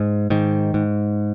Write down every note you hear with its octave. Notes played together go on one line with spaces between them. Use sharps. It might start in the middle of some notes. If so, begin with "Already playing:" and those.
Already playing: G#2
G#2 D#3
G#2